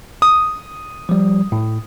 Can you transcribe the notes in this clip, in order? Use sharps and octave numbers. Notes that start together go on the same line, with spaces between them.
D#6
F3 G3
A2